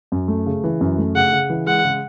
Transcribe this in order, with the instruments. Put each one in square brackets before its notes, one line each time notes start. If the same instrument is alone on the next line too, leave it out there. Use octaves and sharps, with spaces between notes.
[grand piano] F#2
A3
C#3
E3
F#2
A3
[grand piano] C#3 [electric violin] F#5
[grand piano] C#3
E3
[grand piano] G#3 [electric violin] F#5
[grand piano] C#3